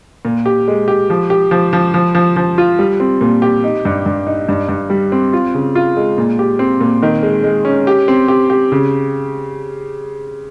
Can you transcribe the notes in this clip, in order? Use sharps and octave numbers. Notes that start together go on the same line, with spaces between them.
A#2
G4
G#3
G4
F3
G4
F3
F3
F3
F3
F3
F4
G3
C4
A#2
G4
D#4
G2
G2
D#4
G2
G2
G3
C4
F4
C#3
F4
G#3
A#2
G4
C4
A#2
D#3
G#3
G#3
C#4
G4
C4
G4
G4
C#3